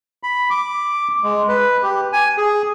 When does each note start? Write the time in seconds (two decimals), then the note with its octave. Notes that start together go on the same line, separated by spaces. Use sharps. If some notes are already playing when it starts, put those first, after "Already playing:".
0.23 B5
0.50 D6
1.23 G#3
1.48 B4
1.83 G4
2.13 G#5
2.37 G#4